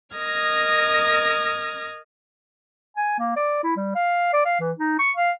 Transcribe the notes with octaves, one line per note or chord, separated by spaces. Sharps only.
A#4 D#5 D#6 F6 G#6 A#6
G#5
A#3
D5
E4
G3
F5
D5
F5
E3
D#4
C#6
F5